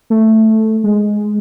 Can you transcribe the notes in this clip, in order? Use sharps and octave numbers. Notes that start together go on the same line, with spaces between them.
A3
G#3